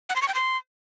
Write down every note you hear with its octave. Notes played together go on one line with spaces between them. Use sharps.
F#5
C6
C#6
G5
C6